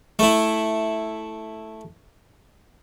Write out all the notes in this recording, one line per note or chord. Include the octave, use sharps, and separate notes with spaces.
A3 E4